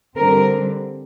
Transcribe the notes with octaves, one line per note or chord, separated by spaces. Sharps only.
D3 G3 C4 A#4